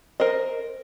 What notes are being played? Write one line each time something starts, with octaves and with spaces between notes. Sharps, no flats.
A#4 C5 D#5